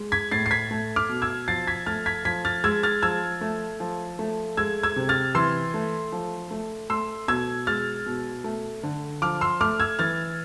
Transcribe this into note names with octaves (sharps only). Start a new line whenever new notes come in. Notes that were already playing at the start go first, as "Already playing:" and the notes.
Already playing: G#3
G#6 B6
A2 A6 C7
C7
G#6 B6
A3
D6 F6
B2
E6 G#6
F3 A6 C7
G#6 B6
A3 F6 A6
G#6 B6
F3 G#6 B6
F6 A6
G#3 E6 G#6
F6 A6
F3 E6 G#6
A3
F3
A3
G#3 E6 G#6
E6 G#6
C3
F6 A6
E3 C6 E6
A3
F3
A3
A3 C6 E6
B2 E6 G#6
G#3 F6 A6
B2
A3
D3
F3 D6 F6
C6 E6
A3 D6 F6
E6 G#6
E3 F6 A6